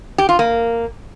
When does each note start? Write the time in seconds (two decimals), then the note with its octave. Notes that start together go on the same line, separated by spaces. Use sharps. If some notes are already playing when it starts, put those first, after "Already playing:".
0.18 G4
0.29 F4
0.39 A#3